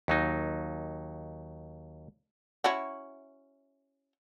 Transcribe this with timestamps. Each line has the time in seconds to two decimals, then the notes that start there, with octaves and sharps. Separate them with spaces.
0.08 D#2 F#3 D#4
2.64 C#4 E4 F#4